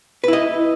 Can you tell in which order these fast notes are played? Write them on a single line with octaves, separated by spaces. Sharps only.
B4 E4 D#5